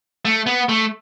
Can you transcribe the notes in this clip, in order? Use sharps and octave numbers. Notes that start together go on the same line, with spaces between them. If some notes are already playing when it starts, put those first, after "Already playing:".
A3
B3
A3